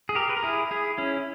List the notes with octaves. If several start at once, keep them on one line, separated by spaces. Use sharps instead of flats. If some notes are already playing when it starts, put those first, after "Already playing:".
G#4
G4 A#4
B4
A#4
E4 G#4
E4 G#4
C#4 E4